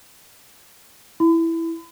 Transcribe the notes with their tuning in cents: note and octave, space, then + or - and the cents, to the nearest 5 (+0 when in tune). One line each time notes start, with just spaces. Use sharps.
E4 +0 B5 +40